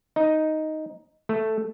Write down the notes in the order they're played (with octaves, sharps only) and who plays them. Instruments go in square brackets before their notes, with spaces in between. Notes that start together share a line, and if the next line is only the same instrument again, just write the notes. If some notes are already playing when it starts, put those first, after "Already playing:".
[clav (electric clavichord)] D#4
A3